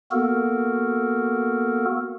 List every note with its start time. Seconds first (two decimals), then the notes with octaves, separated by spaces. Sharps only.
0.12 A#3 B3 F#4 A4 A#4